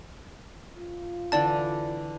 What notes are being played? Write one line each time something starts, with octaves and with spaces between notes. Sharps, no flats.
F4
D3 E3 D4 D5 A5